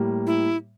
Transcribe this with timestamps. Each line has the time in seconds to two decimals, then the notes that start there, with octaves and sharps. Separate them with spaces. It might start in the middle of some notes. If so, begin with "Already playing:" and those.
Already playing: A2 G3 A#3
0.27 E4